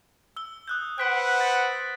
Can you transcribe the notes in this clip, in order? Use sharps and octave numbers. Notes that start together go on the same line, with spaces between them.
E6 G7
D#6 F#6 G6
B4 C5 F#5 F#6 B6 D7
A6